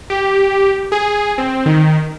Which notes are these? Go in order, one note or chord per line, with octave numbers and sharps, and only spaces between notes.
G4
G#4
C4
D#3